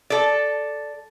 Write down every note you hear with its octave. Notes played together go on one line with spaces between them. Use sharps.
A4 D5